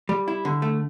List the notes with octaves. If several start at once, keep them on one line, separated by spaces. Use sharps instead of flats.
G3
E4
D3
A3